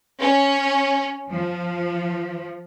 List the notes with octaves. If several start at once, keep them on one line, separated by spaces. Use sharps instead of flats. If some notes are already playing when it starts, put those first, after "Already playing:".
C#4
F3